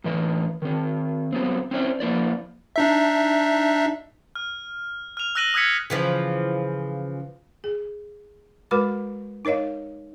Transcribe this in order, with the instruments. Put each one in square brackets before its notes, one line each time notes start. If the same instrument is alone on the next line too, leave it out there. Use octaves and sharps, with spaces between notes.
[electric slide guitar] A2 E3 D#5
D#3 C4
F#3 B3 C4
C4 C#4 E4 C5 D5
F3 A#3 E4 D5
[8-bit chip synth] D4 D#4 E5
[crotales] F6
F6 F7
E6 F#6 A#6 D#7 F#7
D#6 E6 F#6 G#6 B6 C#7
[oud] C#3 E3 F3
[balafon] G#4
G#3 F#4 A#4 B4 B5 D6
D#4 A#4 C#5 D#5 F5